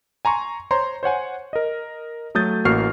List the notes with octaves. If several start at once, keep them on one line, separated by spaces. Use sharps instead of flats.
G#5 A#5 C6 C#6
C5 C#5 A#5 C6
C5 C#5 F#5 G#5
A#4 D#5
F#3 A3 D#6 G6 A6
A1 A#3 F#4 C#6 F6 C7